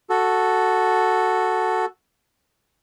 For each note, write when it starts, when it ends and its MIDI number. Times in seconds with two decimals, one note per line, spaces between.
0.10 1.85 66
0.10 1.85 69